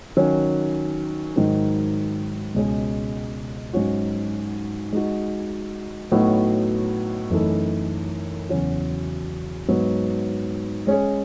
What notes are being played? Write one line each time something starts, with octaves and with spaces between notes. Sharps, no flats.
D#3 F#3 C#4
G#2 D#3 F#3
C#2 B2 G#3 C#4
G#2 F#3 C#4 F#4
G#3 D#4 F#4
A2 F#3 B3 D#4 F#4
F#2 E3 A3 D#4 A4
E2 C#3 F#3 C#4 F#4
G#2 F#3 B3
G#3 C#4 G#4 C#5